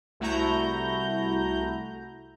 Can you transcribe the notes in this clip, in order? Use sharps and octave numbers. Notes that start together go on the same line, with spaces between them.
C2 A3 E4 F#4 A#5 G6